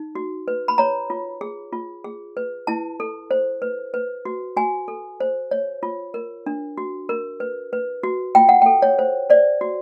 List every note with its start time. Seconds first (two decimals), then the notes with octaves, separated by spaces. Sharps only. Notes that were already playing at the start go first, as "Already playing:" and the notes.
Already playing: D#4
0.15 F#4
0.48 B4
0.68 B5
0.78 C#5 A#5
1.10 F4
1.41 G#4
1.73 F4
2.04 G#4
2.37 B4
2.67 E4 A5
3.00 A4
3.31 C5
3.62 B4
3.94 B4
4.25 F#4
4.56 F#4 G#5
4.88 A4
5.20 C5
5.51 C#5
5.83 F4
6.14 A#4
6.46 D4
6.78 F#4
7.09 A#4
7.40 B4
7.73 B4
8.03 F#4
8.35 F4 G5
8.49 F#5
8.62 A4 G5
8.82 C#5
8.99 C5
9.30 C5 D5
9.61 F#4